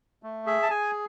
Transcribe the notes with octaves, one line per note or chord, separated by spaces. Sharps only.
A3
G#4 E5
A5
G#4 G#5